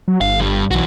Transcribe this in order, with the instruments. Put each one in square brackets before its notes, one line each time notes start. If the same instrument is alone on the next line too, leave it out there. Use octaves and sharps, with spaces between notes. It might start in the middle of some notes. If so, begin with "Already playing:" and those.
[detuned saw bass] F#3
[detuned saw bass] G1 [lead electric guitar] F5
[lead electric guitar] G2 G3
[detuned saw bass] B1 [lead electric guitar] E3 F#4